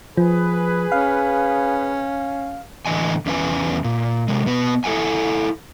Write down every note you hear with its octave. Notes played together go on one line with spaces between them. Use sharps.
F3 G#4 B4
C#4 F5
A2 D3 E3 D#5 G#5
E2 C#4 E4 B4 G#5
A#2
C3 G#3
B2 B3 B4
E4 A4 A#4 F#5 G#5